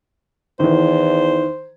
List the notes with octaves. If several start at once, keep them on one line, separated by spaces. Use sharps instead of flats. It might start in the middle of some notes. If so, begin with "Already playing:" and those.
E2 D#3 E3 C5